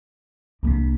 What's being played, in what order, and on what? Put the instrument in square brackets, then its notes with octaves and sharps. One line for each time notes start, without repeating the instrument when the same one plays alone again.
[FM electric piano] C2 C3 [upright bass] A#3 D4